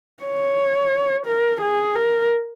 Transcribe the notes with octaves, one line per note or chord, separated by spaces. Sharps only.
C#5
A#4
G#4
A#4